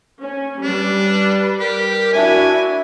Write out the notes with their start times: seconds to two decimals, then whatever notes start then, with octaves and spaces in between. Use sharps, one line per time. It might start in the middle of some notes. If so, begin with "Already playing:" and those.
0.23 C#4
0.63 G3 D4 B4
1.60 G4 A#4
2.13 D4 E4 F#4 E5 G#5